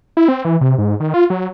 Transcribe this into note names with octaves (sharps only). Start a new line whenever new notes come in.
E4
C4
E3
C3
G#2
D#3
F4
F#3